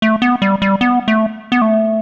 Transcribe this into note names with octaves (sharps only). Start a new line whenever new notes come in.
A3
B3
G3
G3
B3
A3
B3
A3